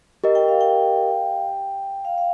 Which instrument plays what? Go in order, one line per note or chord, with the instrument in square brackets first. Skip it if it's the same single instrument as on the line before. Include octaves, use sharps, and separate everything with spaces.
[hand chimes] G4 A#4 D#5
[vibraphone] G5
F5
G5
F5
F5